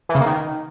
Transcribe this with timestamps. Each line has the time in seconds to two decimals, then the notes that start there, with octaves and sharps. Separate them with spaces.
0.09 E3
0.15 C#3
0.21 A#3
0.26 D#3